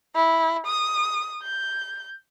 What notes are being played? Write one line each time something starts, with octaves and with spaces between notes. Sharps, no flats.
E4
D#6
G6